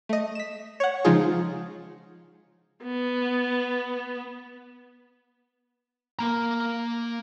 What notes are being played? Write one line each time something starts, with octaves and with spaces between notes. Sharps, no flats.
A3 D#5
B6 E7
C#5 F#5
C#3 F3 G#3 D#4 F4 G#4
B3
A#3 A#5